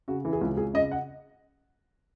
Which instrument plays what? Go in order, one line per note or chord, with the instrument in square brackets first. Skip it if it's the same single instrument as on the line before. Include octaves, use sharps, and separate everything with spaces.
[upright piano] C#3 F#4
E3
G#4
C#2
C#2 G#4
C#3 D#5
F#5